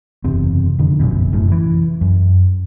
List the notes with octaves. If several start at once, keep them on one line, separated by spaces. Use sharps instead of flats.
F#1 E2 C3 C4
F2 D3 D#3
F1 A#1 F#2 B2
F1 F#2 A2
E3
F#2